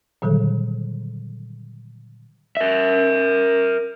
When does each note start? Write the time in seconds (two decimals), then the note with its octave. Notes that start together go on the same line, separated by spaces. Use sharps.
0.22 A#2 D3 D#3 F#3 G3 A4
2.57 A#4 E5